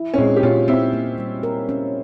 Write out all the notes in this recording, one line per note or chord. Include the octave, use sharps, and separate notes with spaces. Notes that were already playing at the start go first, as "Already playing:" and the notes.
Already playing: E4
C#4
A#2 G#3 C4
G4
A#2 C#4 F4
A#2 C4 E4
A#3
G3
A#4
C#4